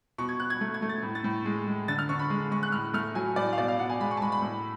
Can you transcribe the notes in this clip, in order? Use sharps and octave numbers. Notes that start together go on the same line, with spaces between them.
B2 C#6
G#6
B2 F#6
G#6
A3
G#6
A3
A6
A2
A6
A2
G#3
G#3
D3 A6
F6
D3 C#6
B5
G#3
G#3 C#6
F#6
A2 F6
A3 F6
F#3 G#5
A2 D5
F5
B2 D5
F5
B2 F#5
G#5
G#3 B5
C#6
A5
G#3 B5
B5
A2